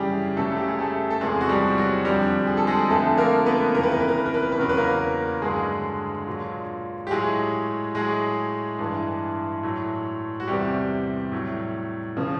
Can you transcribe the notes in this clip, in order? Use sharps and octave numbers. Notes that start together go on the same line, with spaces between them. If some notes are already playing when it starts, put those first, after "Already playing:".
Already playing: F#2 C#3 E3 G3 G4 G#4
F#2 C#3 F#3 A3 A4
G4
G#4
A3 A4
A4
E2 C3 F3 G#3 G#4
F#4
G3 G4
F#3 F#4
F2 D3 F3 G3 G4
G#4
A4
G#3 G#4
F2 D3 F3 A3 A4
A#3 A#4
B3 B4
F2 C#3 E3 A#4
B4
A#4
B4
A#4
B4
A#4
B4
A#4
B4
E2 C#3 F#3 A#4
B4
A#3 A#4
G2 D3 F#3 G#3 G#4
A#2 F#3
G4
A2 F#3 G#3 G#4
A2 F#3 G#3 G#4
G2 E3
A2 F#3
F#4
E2 C3 E3 G3 G4
A2 F#3
C#3 F3